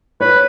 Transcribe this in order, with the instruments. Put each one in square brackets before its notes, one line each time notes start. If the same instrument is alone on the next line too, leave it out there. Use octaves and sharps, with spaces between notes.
[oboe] B4 [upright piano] C#5